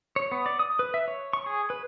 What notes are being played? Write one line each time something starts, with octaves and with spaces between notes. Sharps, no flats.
C#5
B3
D5
D#6
B4
E5
C#5
C#6
G#4
B4